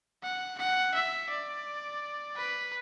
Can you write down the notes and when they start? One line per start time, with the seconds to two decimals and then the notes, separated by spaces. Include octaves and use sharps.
0.23 F#5
0.59 F#5
0.94 E5
1.30 D5
2.36 B4